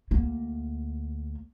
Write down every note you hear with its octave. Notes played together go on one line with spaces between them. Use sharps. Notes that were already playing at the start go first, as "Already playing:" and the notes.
D2 A#3